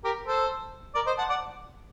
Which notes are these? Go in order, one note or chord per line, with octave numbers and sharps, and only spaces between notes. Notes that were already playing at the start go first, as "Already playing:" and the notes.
G4 A#4
A4 C5
A#4 D5
C5 D#5
F#5 A5
D5 F#5